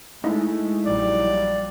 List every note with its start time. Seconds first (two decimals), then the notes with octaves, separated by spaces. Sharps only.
0.24 G#3 A3 D#4 E4 D#5
0.86 A#1 F#3 G3 D5